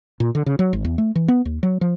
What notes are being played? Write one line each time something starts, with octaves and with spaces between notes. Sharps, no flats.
A#2
D3
C#3
F#3
G#1
E2
A3
E3
B3
D#2
F#3
F3